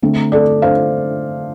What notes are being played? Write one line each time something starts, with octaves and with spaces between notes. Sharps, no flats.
D3 A3 C4
A4 D5
C5 F5